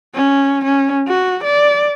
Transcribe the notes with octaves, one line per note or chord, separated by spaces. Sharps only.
C#4
C#4
F#4
D5